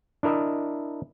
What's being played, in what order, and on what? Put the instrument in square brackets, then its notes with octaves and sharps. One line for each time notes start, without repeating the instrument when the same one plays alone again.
[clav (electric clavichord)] D4 E4 A#4 D#5 E5